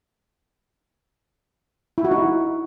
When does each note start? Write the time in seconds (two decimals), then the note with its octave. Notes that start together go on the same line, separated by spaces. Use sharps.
1.98 E4
2.05 F#4
2.11 D#4